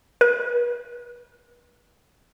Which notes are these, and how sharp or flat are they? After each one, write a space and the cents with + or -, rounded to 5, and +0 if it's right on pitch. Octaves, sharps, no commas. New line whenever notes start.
B4 -35